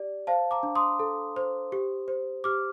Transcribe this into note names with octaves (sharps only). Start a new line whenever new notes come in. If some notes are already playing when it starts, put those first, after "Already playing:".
Already playing: G4 D5
C5 F5 A5
A#5 D6
D4
C6 D#6
A4
C5
G4
C5
G4 D6 F6